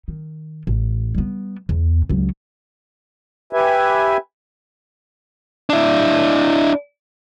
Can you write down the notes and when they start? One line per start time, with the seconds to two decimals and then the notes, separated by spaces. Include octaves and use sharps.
0.08 D#3
0.67 A1
1.15 G3 B3
1.69 E2
2.09 C#2 F#3
3.53 G4 B4 E5 G#5
5.70 D4 E4